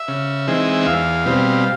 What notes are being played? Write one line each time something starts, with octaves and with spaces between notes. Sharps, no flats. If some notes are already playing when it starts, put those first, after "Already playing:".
Already playing: E5
C#3
E3 G#3 C4 D#4
E2 F5
B2 G3 C4